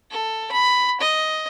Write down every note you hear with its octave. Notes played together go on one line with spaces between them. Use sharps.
A4
B5
D#5